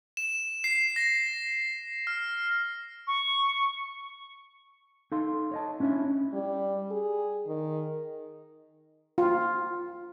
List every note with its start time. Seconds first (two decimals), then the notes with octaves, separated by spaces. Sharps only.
0.17 E7
0.64 C7
0.96 A#6
2.07 F6
3.07 C#6
5.12 D#4 A4 F5 C6
5.51 C#5 D#5 A5
5.80 C#4 D4 E4 C#5 E5
6.33 G3
6.91 G#4
7.47 D#3
9.18 F4